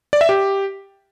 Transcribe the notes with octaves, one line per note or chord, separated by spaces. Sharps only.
D5
E5
G4